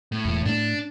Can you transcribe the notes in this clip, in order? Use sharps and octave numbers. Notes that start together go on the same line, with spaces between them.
A2
E1
A2 A3 D4